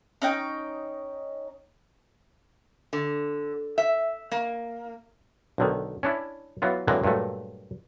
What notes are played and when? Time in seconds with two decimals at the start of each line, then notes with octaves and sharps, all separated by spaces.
0.22 C#4 D#4 G5
2.93 D3
3.78 E5
4.31 A#3
5.58 B1 D3 D#3
6.03 C#4 D4 E4
6.62 E3 F#3 B3 F4
6.87 D3 E3 F#3 G#3 A#3 C4
7.04 G2 A#2 F#3 A3